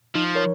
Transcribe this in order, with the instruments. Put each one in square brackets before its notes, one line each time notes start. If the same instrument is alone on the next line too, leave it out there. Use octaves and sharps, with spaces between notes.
[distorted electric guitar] F3 [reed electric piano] D#4
[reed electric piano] A#4 C#5